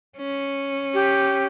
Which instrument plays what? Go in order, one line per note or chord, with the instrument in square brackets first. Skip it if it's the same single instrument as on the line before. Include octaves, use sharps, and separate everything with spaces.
[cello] C#4
[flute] G4